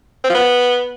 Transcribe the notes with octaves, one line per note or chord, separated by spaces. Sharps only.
C4
F3
B3